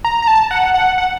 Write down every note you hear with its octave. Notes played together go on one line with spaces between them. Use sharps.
A#5
A#5
A5
F#5
F#5
F#5